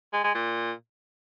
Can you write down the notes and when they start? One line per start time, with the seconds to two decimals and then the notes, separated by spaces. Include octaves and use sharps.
0.13 G#3
0.24 G#3
0.35 A#2